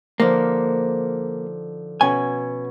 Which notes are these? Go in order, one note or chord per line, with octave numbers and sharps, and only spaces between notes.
D3 F3 A#3 D#4
B2 C#4 G#5